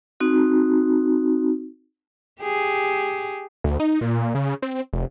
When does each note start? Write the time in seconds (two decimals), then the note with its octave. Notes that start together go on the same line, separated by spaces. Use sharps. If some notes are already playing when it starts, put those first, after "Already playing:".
0.20 C4 D#4 F#4
2.42 G4 G#4
3.64 D2
3.80 D#4
4.01 A#2
4.35 C#3
4.62 C4
4.93 F1